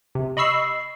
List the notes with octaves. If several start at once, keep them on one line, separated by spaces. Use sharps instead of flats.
C3
D#5 B5 C#6 E6 C7